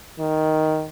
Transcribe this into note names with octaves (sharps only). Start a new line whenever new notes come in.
D#3